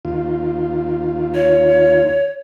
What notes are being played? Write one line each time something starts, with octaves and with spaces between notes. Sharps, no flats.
D#2 F4
C#5